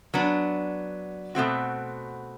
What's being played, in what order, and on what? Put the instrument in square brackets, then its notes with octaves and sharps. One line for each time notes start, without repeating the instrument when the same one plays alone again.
[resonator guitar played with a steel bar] F#3 B3 D4
B2 A3 C4 F#4